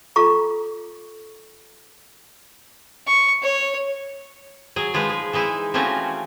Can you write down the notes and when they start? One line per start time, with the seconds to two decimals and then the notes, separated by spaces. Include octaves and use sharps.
0.16 F4 A4 A#5 C#6
3.07 C#6
3.42 C#5
4.76 F#3 G#4
4.94 F3 G#3 D#4 B4
5.10 G#4
5.33 E3 G#3 D#4 E4
5.74 E3 F3 A3 C4 C#4 F#4